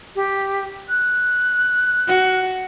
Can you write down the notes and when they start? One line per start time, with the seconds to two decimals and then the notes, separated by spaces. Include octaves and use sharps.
0.16 G4
0.89 F#6
2.08 F#4